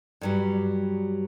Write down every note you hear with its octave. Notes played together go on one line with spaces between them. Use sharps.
G2 F#3 G3